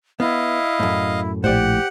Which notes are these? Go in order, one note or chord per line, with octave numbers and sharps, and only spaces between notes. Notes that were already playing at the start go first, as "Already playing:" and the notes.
B3 E4 D#5 F5
F#2 A2
A#1 A2 G4 C5 D5 F#5